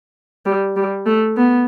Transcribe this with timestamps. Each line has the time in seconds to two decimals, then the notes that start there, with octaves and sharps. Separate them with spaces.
0.46 G3
0.76 G3
1.06 A3
1.37 B3